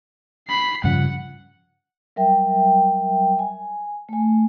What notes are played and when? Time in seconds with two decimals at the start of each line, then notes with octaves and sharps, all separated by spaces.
0.48 B5 C7
0.84 G2 C#3 F3 F#5
2.16 F#3 G3 A#4 E5 G5
3.39 G#5
4.09 A3 G#5